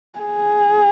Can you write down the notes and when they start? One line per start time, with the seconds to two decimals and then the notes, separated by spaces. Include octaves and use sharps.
0.19 G#4